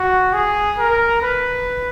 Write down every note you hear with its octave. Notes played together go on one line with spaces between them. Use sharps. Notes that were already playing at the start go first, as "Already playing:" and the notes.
Already playing: F#4
G#4
A#4
B4